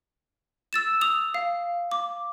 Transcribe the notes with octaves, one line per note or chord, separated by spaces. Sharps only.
E6 A6 E7
D#6 F7
F5
D6